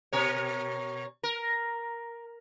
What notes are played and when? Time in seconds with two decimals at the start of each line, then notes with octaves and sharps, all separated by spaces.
0.13 B2 A#4 C#5
1.23 A#4